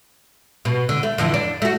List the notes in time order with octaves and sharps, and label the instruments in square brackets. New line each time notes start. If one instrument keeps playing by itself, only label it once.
[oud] B2
D3
A3
F2 D3 E3
D4
A3 F#4